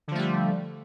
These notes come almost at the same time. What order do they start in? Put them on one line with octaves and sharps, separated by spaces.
D3 F3 A3 G3